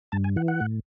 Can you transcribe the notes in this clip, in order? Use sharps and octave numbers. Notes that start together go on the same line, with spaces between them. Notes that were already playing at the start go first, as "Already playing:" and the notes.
G2 A5
G#5
E3 F#5
F#5
A2